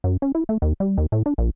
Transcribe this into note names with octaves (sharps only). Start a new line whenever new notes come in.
F#2
C#4
E4
A3
D#2
G3
D#2
A2
D4
A#1